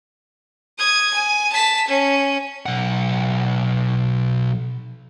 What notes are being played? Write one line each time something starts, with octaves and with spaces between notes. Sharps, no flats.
D#6 G#6
G#5
A5 B6
C#4
B1 F#5